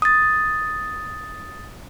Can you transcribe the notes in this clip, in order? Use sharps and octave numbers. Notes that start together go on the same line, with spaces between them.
D#6 A6